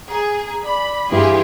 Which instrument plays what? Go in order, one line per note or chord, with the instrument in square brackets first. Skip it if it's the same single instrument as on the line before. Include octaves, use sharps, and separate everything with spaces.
[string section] G#4 [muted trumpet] A#5
[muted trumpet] D5 [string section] B5
[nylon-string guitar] G2 E4 [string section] E3 G4 G#4 [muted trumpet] F4